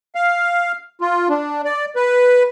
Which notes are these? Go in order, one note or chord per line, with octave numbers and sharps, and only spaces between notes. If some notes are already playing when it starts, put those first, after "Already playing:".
F5
F4
D4
D5
B4